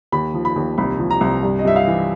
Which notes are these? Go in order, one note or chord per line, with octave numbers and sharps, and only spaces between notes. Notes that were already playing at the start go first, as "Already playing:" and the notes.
D#2 B5
F3
B5
D#2
C2 B5
F3
A#5
C2
G2
D#5
G2 E5
F5
E3